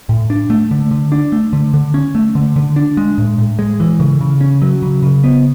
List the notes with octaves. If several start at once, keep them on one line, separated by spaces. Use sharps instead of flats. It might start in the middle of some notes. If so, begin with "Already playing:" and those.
A2
D4
A3
D3
D3
D4
A3
D3
D3
C#4
A3
D3
D3
D4
G#3
A2
A2
G#3
E3
C#3
C#3
C#4
F#3
C#3
C#3
B3